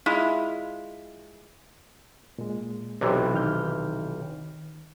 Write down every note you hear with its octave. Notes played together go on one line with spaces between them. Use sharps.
G#3 E4 F4
A#2 G#3
B1 C3 E3 G4 C5
D#3 F6 G6